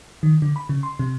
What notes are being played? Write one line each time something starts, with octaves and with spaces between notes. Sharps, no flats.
D#3
D3
B5
C#3
C6
C3